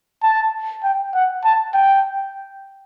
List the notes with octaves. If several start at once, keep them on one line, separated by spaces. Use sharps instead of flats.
A5
G5
F#5
A5
G5